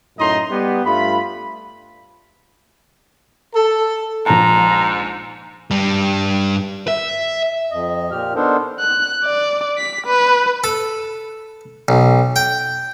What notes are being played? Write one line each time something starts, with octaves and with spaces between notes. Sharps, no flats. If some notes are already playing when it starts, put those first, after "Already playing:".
F#2 A2 D#4 D#5 A#5 C6
G3 B3 G4
G2 A3 F4 B5
A4
A#1 G#2 A5 A#5
G2 G3
E5
F2 D#5
A#2 G4 F6
B3 D4 D#4 A4 A#4 C5
F#6
D5
B6
B4
A4
B1
G5